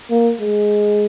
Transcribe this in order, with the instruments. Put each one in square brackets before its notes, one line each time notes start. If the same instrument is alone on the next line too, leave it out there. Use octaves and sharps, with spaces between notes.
[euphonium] A#3
G#3